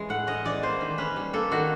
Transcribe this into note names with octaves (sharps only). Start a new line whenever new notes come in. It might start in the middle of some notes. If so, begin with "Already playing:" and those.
Already playing: E3 G#3 C#4
A2 F#5
C#4 D#5
E3 D5
A#3 C5
D#3
C#4 B4
G3
A#3 A4
D#3 F#4